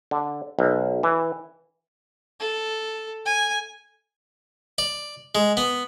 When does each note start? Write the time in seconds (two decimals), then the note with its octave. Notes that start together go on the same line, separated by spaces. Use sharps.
0.11 D3
0.59 B1
1.03 E3
2.40 A4
3.26 G#5
4.78 D5
5.35 G#3
5.57 B3